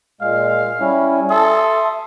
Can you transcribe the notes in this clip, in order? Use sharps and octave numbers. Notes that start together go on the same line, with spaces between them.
A#2 G#3 F5
G3 C#4 E4
A4 E5 C6 D#6